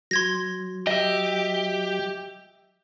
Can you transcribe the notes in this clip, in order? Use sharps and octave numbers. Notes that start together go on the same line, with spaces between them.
F#3 C6 G#6 A#6
G4 D#5 E5